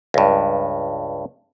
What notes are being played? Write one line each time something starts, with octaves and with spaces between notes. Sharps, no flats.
C#2 G2